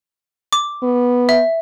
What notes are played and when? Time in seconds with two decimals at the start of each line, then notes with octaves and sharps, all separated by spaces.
0.53 D6
0.83 B3
1.29 E5